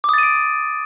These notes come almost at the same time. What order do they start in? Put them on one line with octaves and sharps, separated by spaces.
D6 D#6 A6 D#7 D7